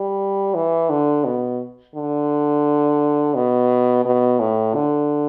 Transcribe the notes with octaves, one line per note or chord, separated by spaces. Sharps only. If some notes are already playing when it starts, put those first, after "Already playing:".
Already playing: G3
E3
D3
B2
D3
B2
B2
A2
D3